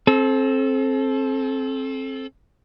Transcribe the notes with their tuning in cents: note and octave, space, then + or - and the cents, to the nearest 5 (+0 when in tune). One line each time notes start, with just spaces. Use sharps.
C4 +20 A4 -25